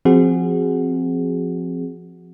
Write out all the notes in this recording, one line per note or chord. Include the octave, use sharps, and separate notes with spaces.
F3 C4 F#4 G#4